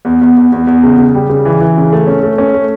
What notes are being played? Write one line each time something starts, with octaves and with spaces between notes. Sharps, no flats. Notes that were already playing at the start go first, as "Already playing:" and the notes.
E2
E2
E2
E2
E2
C#3
C#3
G3
C#3
E3
E3
C#3
A3
C#4
A3
C#4
A3